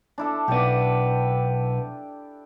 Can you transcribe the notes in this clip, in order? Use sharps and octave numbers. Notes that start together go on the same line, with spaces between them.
D4 E4 A4
B1 B3 G4 D5